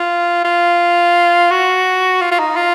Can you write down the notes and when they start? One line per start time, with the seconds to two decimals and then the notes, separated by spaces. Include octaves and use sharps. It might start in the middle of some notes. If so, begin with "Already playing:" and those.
Already playing: F4
0.44 F4
1.51 F#4
2.21 F4
2.31 F4
2.39 D#4
2.56 F4